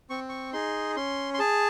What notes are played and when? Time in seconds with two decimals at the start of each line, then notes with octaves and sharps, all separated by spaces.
0.10 C4 C#6
0.29 C#6
0.53 D#4 G#4 C6
0.96 C#4 C6
1.34 C6
1.39 G#4 A5